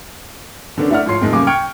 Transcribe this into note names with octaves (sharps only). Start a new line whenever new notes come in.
D3 D#3 B3 C#4 D4
A3 E4 D5 F#5 F6
G#2 F3 C#5 C6 C7
F2 A2 D#3 G#3 D#4
C#3 G3 A#3 G#5 D6
G5 C#6 F6 G#6 C#7 D7